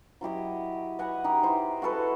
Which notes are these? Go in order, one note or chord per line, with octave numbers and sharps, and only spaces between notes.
F#3 E4 G4 D#5
D#5 F#5 G#5 B5
D#4 G4
E4 C5 D#5
F#4 G#4 A4 B4